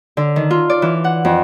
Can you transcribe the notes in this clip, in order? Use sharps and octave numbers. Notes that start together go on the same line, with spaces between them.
D3
D#3
F4
D5
E3
F#5
F2